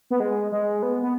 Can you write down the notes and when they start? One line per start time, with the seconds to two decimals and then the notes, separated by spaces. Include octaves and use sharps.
0.10 B3
0.20 G#3
0.52 G#3
0.83 B3
1.02 B3